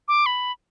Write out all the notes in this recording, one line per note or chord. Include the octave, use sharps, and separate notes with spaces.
D6
B5